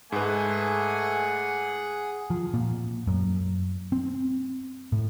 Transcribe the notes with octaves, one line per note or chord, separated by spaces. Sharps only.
G#2 A3 G#4 B4 F#5 G#5
F3
A#2
F#2
C4
A2